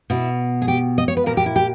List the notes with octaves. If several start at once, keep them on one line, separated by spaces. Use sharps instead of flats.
B2 E4
G#4
G4
D#5
C#5
B4
A#2 A#4
G4
E4
G4